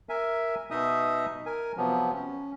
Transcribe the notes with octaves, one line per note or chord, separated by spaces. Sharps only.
A#4 E5 G#5
B2 D#4 D#5 E5 D#6
A#4 G#5
C3 F3 F#3 B3
C#4